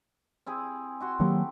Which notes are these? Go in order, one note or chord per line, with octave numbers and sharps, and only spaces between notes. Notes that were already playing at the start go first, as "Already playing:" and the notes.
C4 E4 G#4
E4 F#4 C6
D#3 F#3 A#3 G4 A4